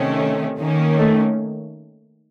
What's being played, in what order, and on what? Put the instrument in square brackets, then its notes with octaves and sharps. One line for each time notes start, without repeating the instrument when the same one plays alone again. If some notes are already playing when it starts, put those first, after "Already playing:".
Already playing: [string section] C3 D#3 A3 C#4
D#3 A#3 C#4
[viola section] A3